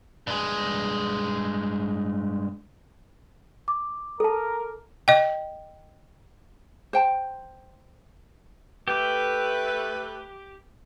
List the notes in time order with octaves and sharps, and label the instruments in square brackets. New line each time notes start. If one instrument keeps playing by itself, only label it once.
[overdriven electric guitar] G2 G#3
[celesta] D6
[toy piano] A4 A5 [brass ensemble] A#4
[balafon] D#5 G5
[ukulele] C5 G5 A5
[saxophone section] A3 B4 [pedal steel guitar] G4